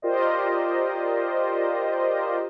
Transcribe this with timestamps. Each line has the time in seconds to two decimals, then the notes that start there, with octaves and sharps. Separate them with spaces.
0.02 F4 G4 A#4 C5 D5 D#5